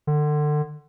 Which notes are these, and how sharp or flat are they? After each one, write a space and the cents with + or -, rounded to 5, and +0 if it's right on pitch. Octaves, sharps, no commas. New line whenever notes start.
D3 +30